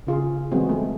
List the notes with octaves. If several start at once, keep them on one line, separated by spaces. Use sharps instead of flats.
C#3 F4 G#4
E3 F#3 G#3 B3 C4 F#4
A3